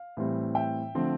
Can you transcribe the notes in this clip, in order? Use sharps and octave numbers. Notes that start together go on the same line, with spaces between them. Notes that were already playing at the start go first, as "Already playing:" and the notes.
Already playing: F5
A2 E3 G3 C4
E5 G5
D3 F3 A3 C4